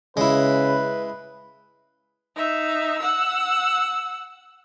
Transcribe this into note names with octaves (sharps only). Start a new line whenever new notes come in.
C#3 G#3 E4 B4
D#4 E5
F#5 E6